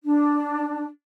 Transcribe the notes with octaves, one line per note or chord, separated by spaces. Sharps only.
D4